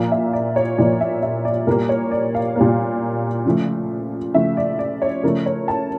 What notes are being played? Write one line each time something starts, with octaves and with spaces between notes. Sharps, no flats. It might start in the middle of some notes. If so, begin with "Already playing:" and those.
Already playing: A#2 F3 A#3 F5
E5
D5
C#5
A#2 F3 A#3 D5
E5
E5
D5
A#2 G3 A#3 A#4
C#5
D5
F5
A#2 G3 A#3
C#3 F3 A3
C#3 F3 A3 E5
D5
D5
C#5
C#3 F3 A3 A#4
C#5
A5